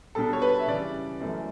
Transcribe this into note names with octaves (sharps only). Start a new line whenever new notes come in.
B2 G3 D4 A4
C#5
B4
E5
C#3 E3 G3 D5
F#2 E3 A3 C#4